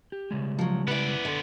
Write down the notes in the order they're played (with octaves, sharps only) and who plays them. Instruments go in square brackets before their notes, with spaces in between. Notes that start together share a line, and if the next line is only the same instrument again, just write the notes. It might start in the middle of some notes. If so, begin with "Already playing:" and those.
[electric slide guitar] G4
C#3 G3 G#3
[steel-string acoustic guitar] F3 F#3
[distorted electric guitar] B3 D5 [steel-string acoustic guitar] E4 B4
[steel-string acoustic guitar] D3